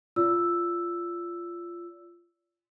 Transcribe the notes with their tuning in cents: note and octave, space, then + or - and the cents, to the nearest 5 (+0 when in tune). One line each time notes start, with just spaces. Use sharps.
F4 -15 D5 -35 E6 +0